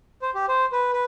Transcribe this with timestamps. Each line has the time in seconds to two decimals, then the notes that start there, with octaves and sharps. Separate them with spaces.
0.22 C5
0.35 G4
0.48 C5
0.72 B4
0.93 B4